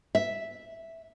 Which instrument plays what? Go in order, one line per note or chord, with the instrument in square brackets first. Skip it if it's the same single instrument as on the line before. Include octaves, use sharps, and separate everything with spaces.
[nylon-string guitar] E5